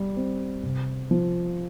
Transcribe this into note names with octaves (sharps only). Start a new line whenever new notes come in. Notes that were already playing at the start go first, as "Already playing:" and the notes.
Already playing: G3
C4
C3
F3